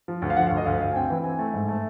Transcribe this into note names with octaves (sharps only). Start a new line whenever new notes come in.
F3
D2
F5
F3 F#5
F5
D2
D#5
D2 F5
D2 F5
G#5
C4 G5
E3
C4 G#5
A3
G#2
A3